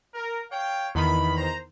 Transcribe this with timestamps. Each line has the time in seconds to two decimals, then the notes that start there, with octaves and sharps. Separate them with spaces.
0.14 A#4
0.50 C#5 F5 G5
0.95 E2 D#3 B5
1.36 C5 A#5